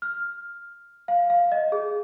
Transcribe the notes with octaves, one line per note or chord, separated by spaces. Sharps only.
F6
F5
F5
D#5
G#4